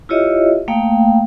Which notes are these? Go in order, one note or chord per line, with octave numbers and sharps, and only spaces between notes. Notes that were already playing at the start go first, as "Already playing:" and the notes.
E4 F4 G4 C#5 D#5 E5
A3 A#3 F5 G5